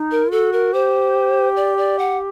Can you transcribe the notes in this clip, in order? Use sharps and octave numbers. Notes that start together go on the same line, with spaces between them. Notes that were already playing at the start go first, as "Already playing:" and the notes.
Already playing: D#4
A#4
F#4 A4
A#4
G4 C5
D5
D5
F#5